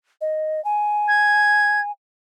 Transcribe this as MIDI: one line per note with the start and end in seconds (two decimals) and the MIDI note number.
0.21 0.63 75
0.65 1.91 80
1.08 1.80 92